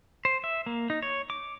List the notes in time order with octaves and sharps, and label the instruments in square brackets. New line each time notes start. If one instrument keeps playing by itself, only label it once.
[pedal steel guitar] C5
E5
A#3
D#4
C#5
D6